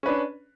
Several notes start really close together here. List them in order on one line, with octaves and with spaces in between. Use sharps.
C#4 B4 D4